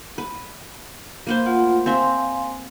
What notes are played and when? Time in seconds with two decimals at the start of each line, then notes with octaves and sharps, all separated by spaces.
0.18 B4
1.27 A#3 B4 C5
1.46 A3 F4 F#5
1.86 C4 E5 F5 G#5 A#5 C6